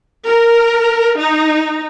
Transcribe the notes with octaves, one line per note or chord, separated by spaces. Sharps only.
A#4
D#4